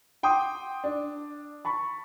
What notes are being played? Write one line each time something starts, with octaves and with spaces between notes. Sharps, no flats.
F#5 G5 C6 D6 D#6
D4
A5 B5 C#6